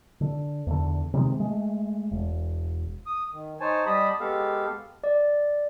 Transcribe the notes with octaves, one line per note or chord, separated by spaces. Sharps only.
D3
E2 D3
C3 D#3 G3 G#3
G#3 A3
E1
D#6
D#3
D#4 C5 C#5 G#5 A5
G3 G4 D#5 A5 B5 D#6
G#3 B3 G4 A4 F5
D5